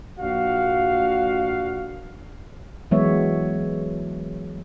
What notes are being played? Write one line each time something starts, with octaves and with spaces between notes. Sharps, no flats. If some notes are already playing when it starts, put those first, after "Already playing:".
A#1 F#4 F5
E3 F#3 G#3 B3 C#5 E5